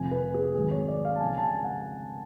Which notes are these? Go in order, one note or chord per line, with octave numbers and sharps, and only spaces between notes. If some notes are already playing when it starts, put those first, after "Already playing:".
Already playing: F1 F2 F3 G#5
B4
G#4
G#1 G#2 F#3 G#4
C#5
D5
F5
A5
C#2 C#3 F3 G#5
A5
G#5
F#5